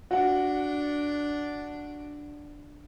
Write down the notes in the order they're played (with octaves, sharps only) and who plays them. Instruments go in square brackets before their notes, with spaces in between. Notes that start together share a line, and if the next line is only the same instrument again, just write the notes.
[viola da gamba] D4 [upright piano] F#4 F#5